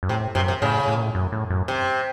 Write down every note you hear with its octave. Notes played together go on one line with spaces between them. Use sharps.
F#2
A2 C3
F#2 C3
C3
A2 C#3
A2
A#2
A2
F#2
A2
F#2
C3